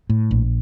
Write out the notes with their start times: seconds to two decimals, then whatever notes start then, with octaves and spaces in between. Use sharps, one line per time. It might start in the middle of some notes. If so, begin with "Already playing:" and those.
0.09 A2
0.31 A#1